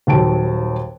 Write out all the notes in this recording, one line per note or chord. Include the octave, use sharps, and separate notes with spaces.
D#1 D#2 F#3 A5 D7